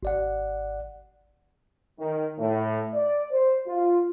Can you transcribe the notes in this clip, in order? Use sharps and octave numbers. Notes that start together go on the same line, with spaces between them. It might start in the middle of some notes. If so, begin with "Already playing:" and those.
G#1 D5 F#5
D#3
A2
D5
C5
F4